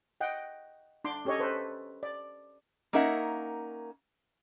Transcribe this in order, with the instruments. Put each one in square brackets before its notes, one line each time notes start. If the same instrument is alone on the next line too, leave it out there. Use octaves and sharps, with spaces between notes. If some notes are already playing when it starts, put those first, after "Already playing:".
[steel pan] D#5 F#5 G5
D4 C6 D6
C#4 G4 A4 C#5 D#5
A4 B4 C5
D5
[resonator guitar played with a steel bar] A#3 C#4 D#4 A#4 E5 F#5